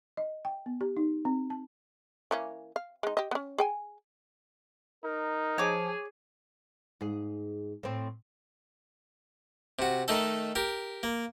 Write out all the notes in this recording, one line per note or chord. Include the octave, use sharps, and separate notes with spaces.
D#5
G5
B3
G4
D#4
C4
A5
E3 A#3 C#4
F5
G#3 D#4
G4 D#5
B3 C#4
G#4 G5 G#5
D#4 A#4
F3 G#4 C#5 D6
G#2 G#4
A2 C4
C3 F#4
D#3 A3 D#4 A4
G4 A#4
A#3